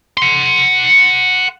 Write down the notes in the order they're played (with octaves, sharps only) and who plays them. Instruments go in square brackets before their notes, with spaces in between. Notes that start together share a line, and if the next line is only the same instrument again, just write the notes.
[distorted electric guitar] F#5 C6